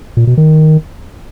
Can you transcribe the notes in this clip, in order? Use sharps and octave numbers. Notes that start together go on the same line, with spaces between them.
A#2
B2
D#3